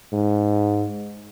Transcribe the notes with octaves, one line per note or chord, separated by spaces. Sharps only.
G#2